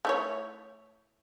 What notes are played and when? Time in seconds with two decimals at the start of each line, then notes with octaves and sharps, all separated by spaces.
0.05 A3 E4 C#5